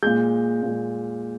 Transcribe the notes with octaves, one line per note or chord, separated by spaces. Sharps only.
A#2 G#3 G6
A#2 G#3